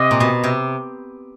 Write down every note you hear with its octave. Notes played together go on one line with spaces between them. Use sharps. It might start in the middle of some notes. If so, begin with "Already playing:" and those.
Already playing: C3 D#5
A#2
B2
C3